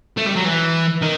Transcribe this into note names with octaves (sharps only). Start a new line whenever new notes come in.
A3
G3
F#3
E3
D#3